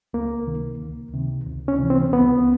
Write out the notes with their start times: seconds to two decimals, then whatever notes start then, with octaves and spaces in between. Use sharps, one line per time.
0.13 C#2 A#3
0.47 C3 D#3
0.81 C#2
1.14 C3 D#3
1.46 C#2
1.68 C#4
1.79 C3 E3
1.90 C4
2.12 C#2 B3